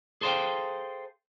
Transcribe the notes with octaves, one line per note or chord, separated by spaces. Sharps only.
G#4 A4 C5 D#5 F5 G5